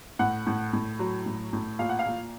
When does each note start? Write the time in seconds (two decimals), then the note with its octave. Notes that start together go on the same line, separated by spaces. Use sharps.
0.19 A2 F#5
0.46 A2
0.73 A2
0.99 F#3
1.26 A2
1.53 A2
1.79 A#2 F5
1.89 F#5
1.99 F5
2.06 A#2